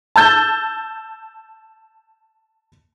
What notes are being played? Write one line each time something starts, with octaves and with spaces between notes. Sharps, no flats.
A5 E6 G6 A6